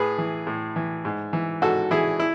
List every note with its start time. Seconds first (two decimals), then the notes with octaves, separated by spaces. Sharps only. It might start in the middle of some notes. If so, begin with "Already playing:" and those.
Already playing: A2 G#4 B4
0.18 E3
0.47 A2
0.76 E3
1.05 G#2
1.33 E3
1.62 G#2 F#4 A4
1.91 E3 E4 G#4
2.20 E4